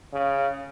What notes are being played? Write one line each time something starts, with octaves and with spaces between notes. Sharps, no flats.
C#3